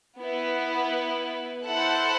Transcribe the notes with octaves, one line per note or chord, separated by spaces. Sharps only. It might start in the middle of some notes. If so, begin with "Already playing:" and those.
B3 E4 B4
E4 A4 C5 F#5